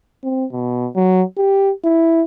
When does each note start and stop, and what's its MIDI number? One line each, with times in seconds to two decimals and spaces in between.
0.24 0.45 60
0.52 0.88 47
0.96 1.22 54
1.37 1.72 67
1.85 2.23 64